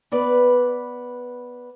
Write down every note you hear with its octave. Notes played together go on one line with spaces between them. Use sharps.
B3 B4 D5